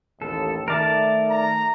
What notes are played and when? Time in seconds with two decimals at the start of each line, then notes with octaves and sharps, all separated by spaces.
0.22 A1 D#2 A4
0.68 D#3 A3 A#4 D5 A5
1.30 A#5